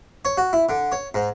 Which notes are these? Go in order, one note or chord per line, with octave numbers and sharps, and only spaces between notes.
C#5
F#4
E4
D3
C#5
G#2